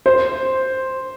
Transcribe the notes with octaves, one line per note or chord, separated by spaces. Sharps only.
C5